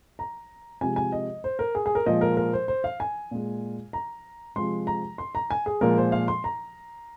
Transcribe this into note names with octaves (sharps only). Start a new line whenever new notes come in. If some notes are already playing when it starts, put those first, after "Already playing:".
A#5
C3 F3 G#3 G#5
G#5
D#5
C5
A#4
G#4
G#4
A#4
A#2 F3 G#3 D#5
A#4
A#4
C5
C5
F5
G#5
A#2 G#3
A#5
C3 F3 G#3 C6
A#5
C6
A#5
G#5
G#4
A#2 F3 G#3 A#4
C5
F5
C6
A#5